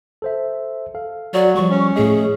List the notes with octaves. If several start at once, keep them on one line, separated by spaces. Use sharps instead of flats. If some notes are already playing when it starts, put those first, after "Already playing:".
A4 C5 E5
A4 F5
F#3 D5
F3 G3 C#6
C#4
A2 A3 G#4 D#5